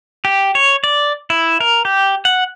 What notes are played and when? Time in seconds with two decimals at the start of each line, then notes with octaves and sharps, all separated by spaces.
0.25 G4
0.55 C#5
0.84 D5
1.30 E4
1.61 A#4
1.85 G4
2.25 F#5